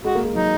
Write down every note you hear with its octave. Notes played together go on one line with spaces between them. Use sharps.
G#3 F#4
A#3
G#3
F#3 D#4